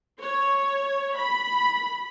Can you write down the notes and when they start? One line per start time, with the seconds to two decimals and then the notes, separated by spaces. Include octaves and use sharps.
0.20 C#5
1.16 B5